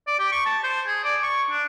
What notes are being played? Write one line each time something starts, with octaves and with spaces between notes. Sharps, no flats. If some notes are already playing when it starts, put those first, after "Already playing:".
D5
G4
C#6
A5
C5
G#4
D5
C#6
D4